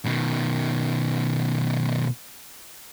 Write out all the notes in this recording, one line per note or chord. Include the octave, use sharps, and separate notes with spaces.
B2 D#3